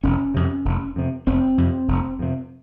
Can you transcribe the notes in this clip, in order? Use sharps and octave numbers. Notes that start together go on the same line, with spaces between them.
F1 C#4
F2 C3
F1
F2 C3
F1 C4
F2 C3
F1
F2 C3